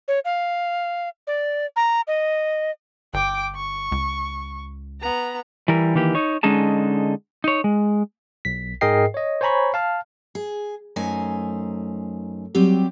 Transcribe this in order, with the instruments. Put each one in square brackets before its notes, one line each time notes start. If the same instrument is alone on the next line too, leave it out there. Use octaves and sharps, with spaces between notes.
[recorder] C#5
F5
D5
A#5
D#5
[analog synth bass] G1 [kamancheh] G5 D6
[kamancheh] C#6
[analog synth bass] C#2
[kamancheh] B3 A#5
[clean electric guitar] E3 G3 A#4
D#3 E3 A#3 G4
D#4 C#5
D3 G#3 C#4 D#4 G#4 A5
D#4 C#5
G#3
[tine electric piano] B1 B6
G#2 G#4 A#4 D#5 G5 C7
C#5 D#5
C5 C#5 G#5 A#5 B5 C#6
F5 A5 F6
[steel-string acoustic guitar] G#4
F#2 A3 D#4 C5 G#5
F#3 G3 C4 G4